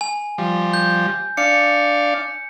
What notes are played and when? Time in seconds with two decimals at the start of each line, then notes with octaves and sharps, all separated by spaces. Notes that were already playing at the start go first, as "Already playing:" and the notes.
0.01 G#5
0.38 F3 G3
0.74 G6
1.37 D4 D5 F5 C#7